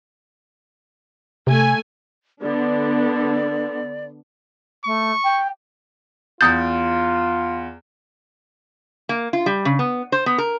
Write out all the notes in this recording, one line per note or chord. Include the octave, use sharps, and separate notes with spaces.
C3 A3 G#5
D3 B3 D4 D5
A3 C#6
G5
E2 F4 D#6 G6 A6
A#3
F4
G3
C#3
B3
C5
B3
A#4